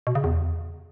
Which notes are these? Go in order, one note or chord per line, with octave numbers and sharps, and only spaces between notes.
B2
C#3
E2